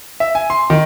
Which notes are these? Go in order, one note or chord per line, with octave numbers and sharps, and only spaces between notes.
E5
G#5
C6
D#3